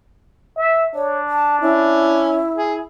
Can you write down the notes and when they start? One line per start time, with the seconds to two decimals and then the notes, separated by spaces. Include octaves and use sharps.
0.57 E5
0.95 D4 C#5
1.29 A5
1.61 C#4 E4
2.56 G#4